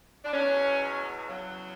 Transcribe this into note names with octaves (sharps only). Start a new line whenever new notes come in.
D4
E2 B2 F#3 C#4
E2 C#3 F#3